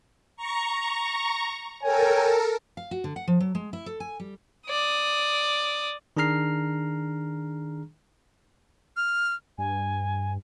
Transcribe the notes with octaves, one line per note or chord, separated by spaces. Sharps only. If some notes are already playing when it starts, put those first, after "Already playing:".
A#5 C#6
A4 A#4 C#5 G5 G#5
F5
F#4
D3
F#5
F3
F#3
G#3
E4
A4
G#5
G3
D5 D#6
D#3 D4 G#4 A#5 F6 C7
F6
G2 G#5